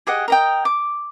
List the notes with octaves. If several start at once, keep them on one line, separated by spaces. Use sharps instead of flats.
G4 G#4 D#5 F#5
A#4 D#5 G5
D6